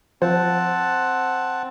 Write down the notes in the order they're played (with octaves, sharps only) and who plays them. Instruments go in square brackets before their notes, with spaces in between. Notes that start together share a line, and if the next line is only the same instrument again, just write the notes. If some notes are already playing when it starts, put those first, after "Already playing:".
[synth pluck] F3 C5 [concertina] C4 F#5 A5